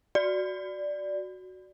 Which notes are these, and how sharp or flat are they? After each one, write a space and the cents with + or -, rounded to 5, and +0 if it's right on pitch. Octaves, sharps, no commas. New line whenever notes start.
F#4 +0 D5 +0